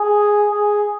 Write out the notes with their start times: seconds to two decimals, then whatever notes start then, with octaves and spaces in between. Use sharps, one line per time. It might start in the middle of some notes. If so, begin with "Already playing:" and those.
Already playing: G#4
0.51 G#4